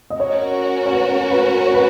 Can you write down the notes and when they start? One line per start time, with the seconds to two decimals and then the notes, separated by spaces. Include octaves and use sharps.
0.10 D#5
0.19 C#4 F#4 A#4 C#5
0.86 C#5
0.93 B4
1.30 B4
1.66 C#5
1.74 B4